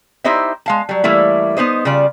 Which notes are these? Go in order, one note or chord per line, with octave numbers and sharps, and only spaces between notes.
D#4 E4 G4 C5 D#5 E5
G#3 F5 A5
F#3 G3
E3 G3 A3 A#3 E4
B3 D#4 C5 D#5
C#3 G3 F4 D5